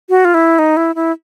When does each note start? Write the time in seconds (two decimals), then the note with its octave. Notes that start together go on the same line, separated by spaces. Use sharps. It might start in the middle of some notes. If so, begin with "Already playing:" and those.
0.09 F#4
0.25 F4
0.34 E4
0.59 D#4
0.77 E4
0.95 E4